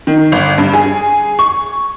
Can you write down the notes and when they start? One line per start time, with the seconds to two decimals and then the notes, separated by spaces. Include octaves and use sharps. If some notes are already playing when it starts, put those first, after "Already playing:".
0.07 D#3
0.32 G1
0.58 G2
0.73 G#4
1.39 C#6